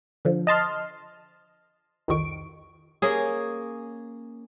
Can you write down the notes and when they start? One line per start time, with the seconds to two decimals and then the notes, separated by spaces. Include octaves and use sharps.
0.25 D3 F3
0.47 D#5 A5 C6 F6
2.08 C2 F2 D#3 C#6 D7
3.02 A#3 C#4 G#4